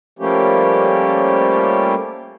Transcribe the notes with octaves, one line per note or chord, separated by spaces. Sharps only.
F3 G3 A3 A#3 C#4 G4